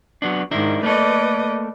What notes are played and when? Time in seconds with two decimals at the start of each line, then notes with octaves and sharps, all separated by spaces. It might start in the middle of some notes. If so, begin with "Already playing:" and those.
0.22 F#3 B3 D4
0.51 G#2 D#3 D4 E4 A#4
0.83 A3 A#3 A4 B4 D5 D#5